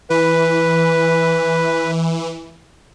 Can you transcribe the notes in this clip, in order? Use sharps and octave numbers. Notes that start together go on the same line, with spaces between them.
E3 B4